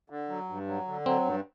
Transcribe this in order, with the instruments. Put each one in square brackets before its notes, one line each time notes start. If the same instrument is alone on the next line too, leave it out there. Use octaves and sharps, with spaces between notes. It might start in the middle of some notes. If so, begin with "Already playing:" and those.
[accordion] D3
F#3
G2
F#3
D3
[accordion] F#3 [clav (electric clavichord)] C4
[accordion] G2